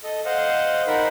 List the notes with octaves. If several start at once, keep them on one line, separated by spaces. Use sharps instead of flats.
A4 D#5
C5 D#5 F5 F#5
D#4 A#4 C5 F#5 B5